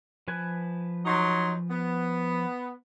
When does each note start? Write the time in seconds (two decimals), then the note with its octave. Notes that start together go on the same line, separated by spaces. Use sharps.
0.28 F3 B4 G#5
1.05 F#3 D#4 C6
1.70 B3